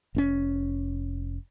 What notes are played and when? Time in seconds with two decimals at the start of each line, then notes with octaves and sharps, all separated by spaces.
0.15 F1 C4 C#4